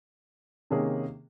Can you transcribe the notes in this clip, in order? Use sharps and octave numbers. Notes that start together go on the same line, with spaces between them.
C3 D#3 A#3 C#4 G#4